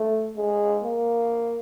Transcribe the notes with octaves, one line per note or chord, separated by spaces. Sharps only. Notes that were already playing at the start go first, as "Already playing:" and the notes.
Already playing: A3
G#3
A#3